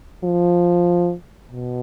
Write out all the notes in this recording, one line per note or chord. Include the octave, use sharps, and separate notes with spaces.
F3
B2